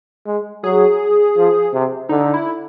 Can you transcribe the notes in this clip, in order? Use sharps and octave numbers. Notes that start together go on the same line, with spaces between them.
G#3
F#3 G#4
F3
C3
D3 D#4
E4